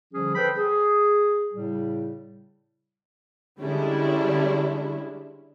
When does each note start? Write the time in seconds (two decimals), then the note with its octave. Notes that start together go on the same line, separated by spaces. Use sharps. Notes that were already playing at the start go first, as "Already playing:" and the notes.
0.13 D3 F3 G3 C#4 G#4
0.35 A4 B4 C5 G5 B5
0.56 G#4
1.53 A2 C#3 G3
3.60 D3 G3 G#3 C#4 D4 E4